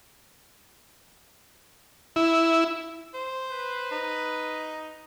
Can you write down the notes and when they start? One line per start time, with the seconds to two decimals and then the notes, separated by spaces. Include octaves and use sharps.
2.16 E4
3.14 C5
3.50 B4
3.91 D#4